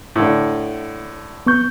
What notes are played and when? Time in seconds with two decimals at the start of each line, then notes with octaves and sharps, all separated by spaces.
0.16 A2 D3
1.46 B3 C#6 G6